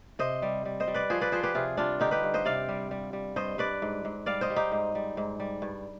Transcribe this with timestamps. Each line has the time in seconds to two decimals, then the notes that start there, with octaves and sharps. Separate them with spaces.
0.19 C3 C5 D#5
0.42 G3
0.65 G3
0.80 C5 D#5
0.87 G3
0.94 B4 D5
1.10 F3 G#4 C5
1.21 B4 D5
1.32 F3 G#4 C5
1.43 G4 B4
1.55 C3 F4 G#4
1.77 G3 D4 F4
2.00 D3 D#4 G4
2.11 G4 B4
2.23 G2
2.34 C5 D#5
2.45 C3 D5 F5
2.69 G3
2.91 G3
3.13 G3
3.36 G2 C5 D#5
3.58 G2 B4 D5
3.82 G#2
4.05 G#2
4.26 G3 D5 F5
4.41 C5 D#5
4.50 G3
4.56 D#4 G4
4.72 G#2
4.95 G3
5.17 G#2
5.40 G3
5.62 G2